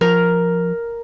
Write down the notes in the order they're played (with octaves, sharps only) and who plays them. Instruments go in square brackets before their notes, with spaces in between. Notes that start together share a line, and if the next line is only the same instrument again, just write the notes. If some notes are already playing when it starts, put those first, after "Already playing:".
[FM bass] F3 [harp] A#4 F6